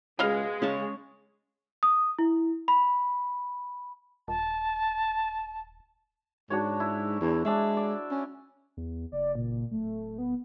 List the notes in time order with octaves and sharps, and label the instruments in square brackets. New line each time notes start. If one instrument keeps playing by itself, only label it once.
[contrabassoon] C#2 [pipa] B2 D#5 F5 [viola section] G#3
[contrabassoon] C#3 [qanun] C#4 C#5 A5
[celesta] D#6
E4
B5
[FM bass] D#1 [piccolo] A5
[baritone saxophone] G#2 [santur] D4 F#4 C#5
[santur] E4
[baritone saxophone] E2
[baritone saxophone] G#3 [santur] D4 C5 E5
[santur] D5
[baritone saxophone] C#4
[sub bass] E2
[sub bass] F#1 [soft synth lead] D5
[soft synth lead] A#2
[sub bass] D1 [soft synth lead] A3
[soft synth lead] B3